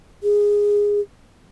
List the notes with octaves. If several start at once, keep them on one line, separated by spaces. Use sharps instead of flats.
G#4